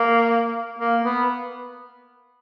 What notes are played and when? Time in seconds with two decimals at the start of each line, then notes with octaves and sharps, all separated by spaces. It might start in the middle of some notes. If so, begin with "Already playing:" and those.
Already playing: A#3
0.79 A#3
1.04 B3